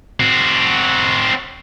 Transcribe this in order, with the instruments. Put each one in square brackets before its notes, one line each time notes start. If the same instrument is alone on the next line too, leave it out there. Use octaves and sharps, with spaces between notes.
[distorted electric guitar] C4 F#4